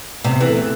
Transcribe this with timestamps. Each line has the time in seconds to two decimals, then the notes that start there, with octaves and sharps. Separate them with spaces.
0.24 C3 B3 B4
0.41 E3
0.46 A3 A4